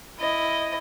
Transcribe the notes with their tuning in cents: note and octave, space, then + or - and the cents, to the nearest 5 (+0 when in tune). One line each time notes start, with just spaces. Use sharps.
E4 +0 D#5 +0